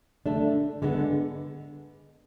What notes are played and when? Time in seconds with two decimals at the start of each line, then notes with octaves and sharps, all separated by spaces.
0.26 D3 A3 D4
0.82 D3 G#3 B3